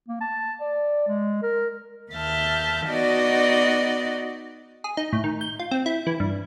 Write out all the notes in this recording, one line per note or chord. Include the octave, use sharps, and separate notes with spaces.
A#3
A5
D5
G#3
A#4
D#2 E5 A5 F6 G6
B3 D#4 F#4 D5 D#5
G#4
D#4
A2
D#3
G6
F4
C4
E4
E3
G2